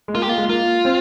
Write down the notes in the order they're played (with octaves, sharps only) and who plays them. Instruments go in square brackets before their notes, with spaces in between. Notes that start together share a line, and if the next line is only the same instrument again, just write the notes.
[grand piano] G#3
[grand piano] A#3 [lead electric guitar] F4
[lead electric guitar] G4
[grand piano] A#3
[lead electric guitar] F4
[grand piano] G#3
[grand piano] A#3 [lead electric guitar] F4
[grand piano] C4